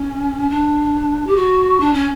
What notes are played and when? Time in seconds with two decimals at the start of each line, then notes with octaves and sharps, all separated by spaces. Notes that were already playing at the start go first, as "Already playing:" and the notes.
Already playing: C#4
0.50 D4
1.27 G4
1.36 F#4
1.80 D4
1.93 C#4